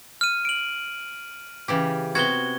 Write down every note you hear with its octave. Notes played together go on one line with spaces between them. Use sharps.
F6 D#7
D7 F#7
C#3 E3 G4
C3 B3 F#4 G#6 G7